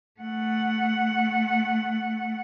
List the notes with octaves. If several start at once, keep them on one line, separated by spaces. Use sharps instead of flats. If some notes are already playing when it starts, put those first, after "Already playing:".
A3 F#5